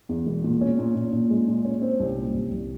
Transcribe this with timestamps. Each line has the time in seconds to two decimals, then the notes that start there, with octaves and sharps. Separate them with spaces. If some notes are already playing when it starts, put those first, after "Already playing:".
0.09 E2
0.26 E1
0.44 A#2
0.61 C#4
0.79 A#2
0.95 A#2
1.13 A#2
1.30 G#3
1.48 A#2
1.65 C#4
1.82 C4
2.00 C2
2.17 A#2
2.34 C2
2.51 C2